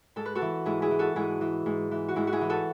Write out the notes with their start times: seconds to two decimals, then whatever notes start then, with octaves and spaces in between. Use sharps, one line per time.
0.16 G#2 A4
0.25 B4
0.35 F#4 A4
0.42 E3
0.66 G#2 E4 G#4
0.82 E4 G#4
0.91 E3
0.99 F#4 A4
1.16 G#2 E4 G#4
1.41 E3
1.66 G#2
1.91 E3
2.08 F#4
2.16 G#2 E4
2.27 F#4
2.32 E4 G#4
2.41 E3
2.50 F#4 A4